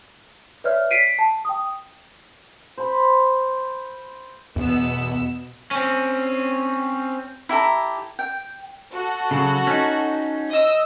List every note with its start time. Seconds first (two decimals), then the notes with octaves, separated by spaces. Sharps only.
0.64 B4 C#5 D5 E5 F6
0.91 B6 C7 D7 D#7
1.19 A5
1.45 G5 D#6
2.78 C5 B5
4.56 E2 B2 B3 E6
5.71 C4 C#4
7.49 E4 G4 A4 A#5
8.19 G5
8.92 F#4 A4
9.31 C#3 F#3
9.67 C#4 D#4
10.50 D#5 E6